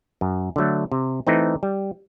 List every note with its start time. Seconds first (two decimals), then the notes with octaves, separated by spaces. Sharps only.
0.21 F#2
0.56 D3 F#3 A3
0.92 C3
1.27 E3 A3 C4 D#4
1.63 G3